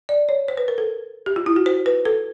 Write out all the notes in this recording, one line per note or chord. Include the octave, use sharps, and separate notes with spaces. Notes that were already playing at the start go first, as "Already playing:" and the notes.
D5
C#5
C5
B4
A#4
A4
G4
F4
E4
F#4
C5
B4
A4